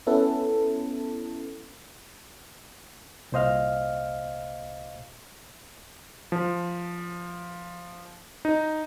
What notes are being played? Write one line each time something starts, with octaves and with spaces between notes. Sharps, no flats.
B3 C#4 E4 A4 B4
C2 A#2 C5 D#5 F5 F6
F3
D#4